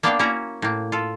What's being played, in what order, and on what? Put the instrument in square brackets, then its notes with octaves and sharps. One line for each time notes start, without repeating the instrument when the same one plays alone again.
[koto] A#3 B3 D4 D5 F5 G5
A#3 C#4 E4 F#4 A#5
A2 A#3
F4 A4